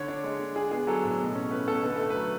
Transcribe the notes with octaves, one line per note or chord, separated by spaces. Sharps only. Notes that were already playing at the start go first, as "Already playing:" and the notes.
Already playing: D3 C#5
D4
G#3
D3
D4 G#4
B3 G#4
F#3 A4
A2
B2
C#4
A3 B4
B2 A4
D3 B4
A3 A4
B4
F#3